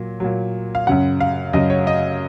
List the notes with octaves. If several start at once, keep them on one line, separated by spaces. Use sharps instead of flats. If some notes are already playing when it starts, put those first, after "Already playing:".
Already playing: A#2 F#3
A#2 F#3
F5
F#2 C#3 F#3 F#5
F5
F#2 C#3 F#3 D#5
C#5
D#5